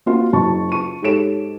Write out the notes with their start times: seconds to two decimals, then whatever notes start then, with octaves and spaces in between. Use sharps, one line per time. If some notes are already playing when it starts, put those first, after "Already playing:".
0.06 A#3 C4 F4 F#4
0.32 F#1 F#3 A5 C#6
0.71 F4 C#6 D#7
1.02 G#2 G4 A4 C#5 D7 E7